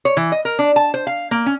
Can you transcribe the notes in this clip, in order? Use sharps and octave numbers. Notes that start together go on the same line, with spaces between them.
C#5
E3
D#5
A#4
D4
A5
C5
F5
A#3
C#4